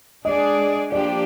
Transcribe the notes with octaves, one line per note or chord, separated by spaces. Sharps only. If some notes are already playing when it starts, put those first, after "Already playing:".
G#3 D4 G#4 D5 D#5
F3 A#3 D4 G4 D5